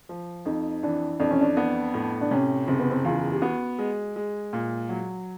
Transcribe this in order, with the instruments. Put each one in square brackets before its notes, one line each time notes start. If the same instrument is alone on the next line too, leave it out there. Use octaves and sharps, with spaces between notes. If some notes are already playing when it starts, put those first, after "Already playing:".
[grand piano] F3
[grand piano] F2 [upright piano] D#4
[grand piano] E3 [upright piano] D4
[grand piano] F2 [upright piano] D4
[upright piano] C#4
D4
[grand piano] B3
A2
[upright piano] D4
[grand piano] C3 [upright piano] C#4
[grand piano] F#1 [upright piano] C4
[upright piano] B3
C4
[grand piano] E2 [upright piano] F4
[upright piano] G4
[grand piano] B3 [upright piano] F#4
[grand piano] G#3
G#3
A#2
F#3